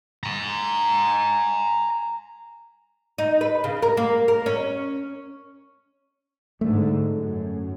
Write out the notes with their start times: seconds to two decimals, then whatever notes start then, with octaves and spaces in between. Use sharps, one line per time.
0.23 G#5 A#5
3.18 D#4
3.41 B4
3.64 C#3
3.82 A#4
3.97 A#3
4.28 A#4
4.46 C#4
6.61 G#2 D3 A3
7.09 F#2